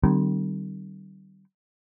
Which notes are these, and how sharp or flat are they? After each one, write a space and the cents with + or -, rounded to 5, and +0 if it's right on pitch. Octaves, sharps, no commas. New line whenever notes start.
D3 +35 G3 -35 C4 -30